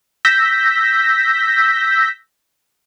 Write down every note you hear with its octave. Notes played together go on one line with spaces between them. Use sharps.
E6 G6 A#6 B6